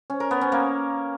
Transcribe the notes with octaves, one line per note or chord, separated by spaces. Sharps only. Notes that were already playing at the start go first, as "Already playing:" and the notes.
C#4
A#4
B3
C#4
A#3